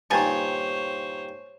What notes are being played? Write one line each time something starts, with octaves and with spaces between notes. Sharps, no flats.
G2 A#2 D#3 C5 C#5 G#5 A5